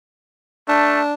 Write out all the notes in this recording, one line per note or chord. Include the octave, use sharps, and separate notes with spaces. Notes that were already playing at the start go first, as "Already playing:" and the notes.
A3 D4